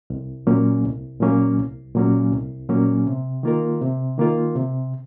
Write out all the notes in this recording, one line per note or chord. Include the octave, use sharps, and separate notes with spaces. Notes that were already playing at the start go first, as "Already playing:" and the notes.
C2
A#2 F#3 A#3 C#4
C2
A#2 F#3 A#3 C#4
C2
A#2 F#3 A#3 C#4
C2
A#2 F#3 A#3 C#4
C3
D#3 A#3 F4 A#4
C3
D#3 A#3 F4 A#4
C3